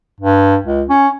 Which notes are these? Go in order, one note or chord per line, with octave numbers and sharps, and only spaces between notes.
G2
C#2
C#4